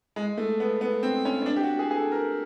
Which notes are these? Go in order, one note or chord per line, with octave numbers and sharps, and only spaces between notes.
G#3
A3
B3
B3
C4
C#4
C#4
D4
G4
F#4
G#4
G#4
A4
A#4